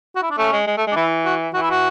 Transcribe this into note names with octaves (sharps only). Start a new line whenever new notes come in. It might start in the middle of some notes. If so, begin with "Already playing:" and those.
F#4
E4
D4
A3 C#4
G#3
G#3
A3
G#3
D4
E3 E4
F#4
E3 F#4
E4
F#4